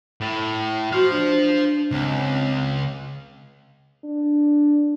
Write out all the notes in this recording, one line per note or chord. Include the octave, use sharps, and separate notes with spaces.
A2
F#4 C5 F5
D4
C#2 C4
D4